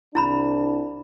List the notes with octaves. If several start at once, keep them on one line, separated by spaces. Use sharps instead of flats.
C2 D4 E4 A#5 B5